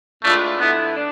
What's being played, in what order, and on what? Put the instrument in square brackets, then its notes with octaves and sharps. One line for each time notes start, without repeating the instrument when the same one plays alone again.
[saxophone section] A2 G#3 D4 F4 B4 [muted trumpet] A3
[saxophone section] D3 A3 E4 [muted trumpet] B3
[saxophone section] D4